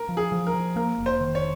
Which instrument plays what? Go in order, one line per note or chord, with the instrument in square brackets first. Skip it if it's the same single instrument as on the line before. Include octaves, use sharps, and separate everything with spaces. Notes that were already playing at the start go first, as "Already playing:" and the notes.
Already playing: [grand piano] A#4
[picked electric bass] F3
[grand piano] G#4
[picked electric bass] F3
[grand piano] A#4
[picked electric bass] F3
[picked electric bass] A#3 [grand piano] A#4
[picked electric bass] F1
[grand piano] C5
[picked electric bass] D#3
[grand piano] C#5